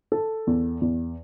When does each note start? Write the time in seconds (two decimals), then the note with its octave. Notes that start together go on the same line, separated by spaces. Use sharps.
0.12 A4
0.47 E2
0.81 E2